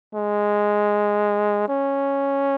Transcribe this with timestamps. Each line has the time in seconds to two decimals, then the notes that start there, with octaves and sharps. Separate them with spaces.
0.15 G#3
1.69 C#4